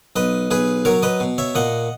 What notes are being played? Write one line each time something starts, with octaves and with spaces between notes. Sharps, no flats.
B1 B4 D#5
B1 G#4 B4
F#3 A#4 C#5
B4 D#5
B2
C#5 E5
A#2 D#5 F#5